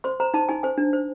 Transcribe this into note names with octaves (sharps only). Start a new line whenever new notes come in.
C5 C6
C5 A#5
D#4 A5
D#4 G#5
C5 G#5
D4
C5